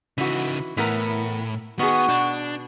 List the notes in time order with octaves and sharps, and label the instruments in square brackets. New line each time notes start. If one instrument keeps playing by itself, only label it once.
[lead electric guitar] C#3 D#4 [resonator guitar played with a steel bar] E3 F#4
[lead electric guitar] A2 [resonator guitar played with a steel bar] E3 B3 A#4
[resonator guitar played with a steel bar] D#3 G#4 [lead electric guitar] B3 [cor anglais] F#4
[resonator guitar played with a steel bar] B2 [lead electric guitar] D4